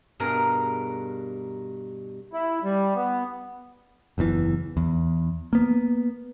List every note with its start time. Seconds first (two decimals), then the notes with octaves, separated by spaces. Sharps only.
0.20 G2 B2 G#4 A#4 D#5
2.33 E4
2.64 G3
2.96 B3
4.18 F#1 E2 A2 E3
4.77 E2
5.53 A#3 B3